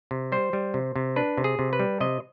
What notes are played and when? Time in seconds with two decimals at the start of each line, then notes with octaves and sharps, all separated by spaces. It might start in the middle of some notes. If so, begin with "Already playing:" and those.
0.11 C3
0.32 G3 C5
0.53 G3
0.74 C3
0.96 C3
1.16 D4 B4
1.38 C3
1.44 G#4
1.59 C3
1.73 B4
1.80 G3
2.01 C3 D#5